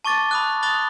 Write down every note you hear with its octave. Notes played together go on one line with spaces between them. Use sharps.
A5 C#6 D6 A6
B5 D#6 F#6
B5 D#6 F#6 A6 G7